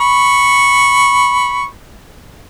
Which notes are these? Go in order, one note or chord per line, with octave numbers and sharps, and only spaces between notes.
B5 C#6